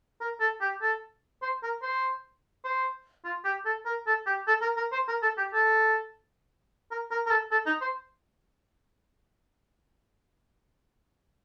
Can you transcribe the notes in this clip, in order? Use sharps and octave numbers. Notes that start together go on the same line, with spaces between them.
A#4
A4
G4
A4
C5
A#4
C5
C5
F4
G4
A4
A#4
A4
G4
A4
A#4
A#4
C5
A#4
A4
G4
A4
A#4
A#4
A#4
A4
A4
D#4
C5